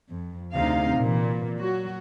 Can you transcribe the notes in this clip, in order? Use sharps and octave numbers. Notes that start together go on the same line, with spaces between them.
F2
D2 C3 D#4 F5
A#2 E3
F#3 F#4